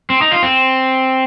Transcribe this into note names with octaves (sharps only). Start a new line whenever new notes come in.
C4
D#4
F4
C4